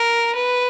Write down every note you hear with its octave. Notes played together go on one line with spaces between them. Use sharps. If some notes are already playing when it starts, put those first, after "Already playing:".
Already playing: A#4
B4